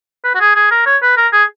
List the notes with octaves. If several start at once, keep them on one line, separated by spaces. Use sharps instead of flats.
B4
F#4
G#4
G#4
A#4
C#5
B4
A#4
G#4